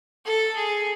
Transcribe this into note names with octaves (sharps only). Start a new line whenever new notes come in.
A4
G#4